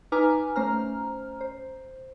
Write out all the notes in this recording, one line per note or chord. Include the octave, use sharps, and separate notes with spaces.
D#4 B4 G#5 A#5 D6 F6
A3 C#4 C5 A#5 F6
C5